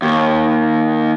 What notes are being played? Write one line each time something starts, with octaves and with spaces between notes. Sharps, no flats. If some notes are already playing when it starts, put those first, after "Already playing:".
D#2